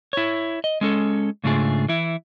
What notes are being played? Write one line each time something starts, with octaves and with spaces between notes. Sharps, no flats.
E4 C#5
D#5
G#3 C#4 A4
G#2 C#3 A3 D4 F4 G#4
E3 E4